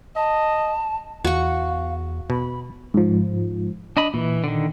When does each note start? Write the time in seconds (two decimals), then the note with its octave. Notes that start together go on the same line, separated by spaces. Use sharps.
0.16 D#5 A5
1.25 E2 F#4 F5 C#6
2.30 B2 B5
2.94 G#2 F3
3.97 D4 D#5 B5
4.14 A#2 E3
4.44 D3 D#3